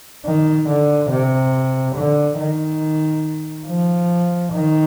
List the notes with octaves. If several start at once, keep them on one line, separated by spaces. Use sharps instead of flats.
D#3
D3
C3
D3
D#3
F3
D#3